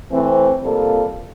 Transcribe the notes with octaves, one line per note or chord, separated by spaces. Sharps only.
E3 A3 C4
C3 G3 A#3 F4 A4